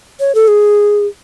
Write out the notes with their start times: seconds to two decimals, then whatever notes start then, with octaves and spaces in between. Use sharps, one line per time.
0.20 C#5
0.35 A4
0.48 G#4